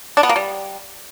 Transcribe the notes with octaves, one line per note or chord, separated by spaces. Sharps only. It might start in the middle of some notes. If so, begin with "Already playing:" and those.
D4
B3
A#3
G3